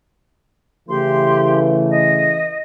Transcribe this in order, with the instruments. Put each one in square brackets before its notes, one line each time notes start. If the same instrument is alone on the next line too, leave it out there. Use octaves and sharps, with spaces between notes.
[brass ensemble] C#3 E3 A3 [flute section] G4 C6
[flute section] D#5